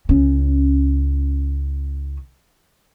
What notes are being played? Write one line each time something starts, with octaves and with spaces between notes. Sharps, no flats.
C#2 C#4